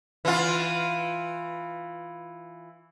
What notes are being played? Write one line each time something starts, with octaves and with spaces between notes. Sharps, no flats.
E3 F4